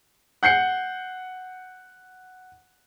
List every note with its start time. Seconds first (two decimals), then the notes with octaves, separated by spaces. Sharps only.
0.43 F#5 G6 C7 C#7